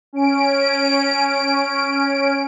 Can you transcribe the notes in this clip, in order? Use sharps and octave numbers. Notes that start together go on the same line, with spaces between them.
C#4 D7